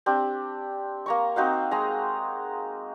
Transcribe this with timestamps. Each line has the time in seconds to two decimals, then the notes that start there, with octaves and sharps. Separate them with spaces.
0.06 C4 D4 G4
1.06 A#3 A#5 C#6
1.36 C4 D#4 F#4 F5
1.71 G#3 G#4 A#5